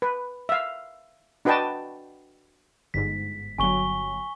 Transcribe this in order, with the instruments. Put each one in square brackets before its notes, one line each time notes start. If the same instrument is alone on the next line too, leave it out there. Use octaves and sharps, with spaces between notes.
[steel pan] B4
E5 F5
D4 F#4 B4 D#5 G5 A5
[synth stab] G1 G#2 [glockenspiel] B6
[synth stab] G1 F#3 [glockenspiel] G#5 C#6 G7